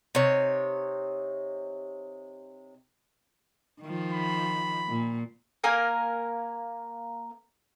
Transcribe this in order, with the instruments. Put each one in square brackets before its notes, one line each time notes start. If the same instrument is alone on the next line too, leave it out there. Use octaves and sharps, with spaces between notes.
[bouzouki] C3 D#4 C#5
[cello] D#3 F3
[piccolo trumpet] B5
[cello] A#2
[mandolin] A#3 A#4 G#5